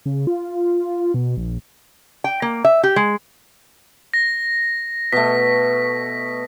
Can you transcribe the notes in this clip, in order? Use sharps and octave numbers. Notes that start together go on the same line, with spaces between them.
C#3
F4
B2
A#1
G5
A#3
E5
G4
G#3
A#6
B2 A3 B6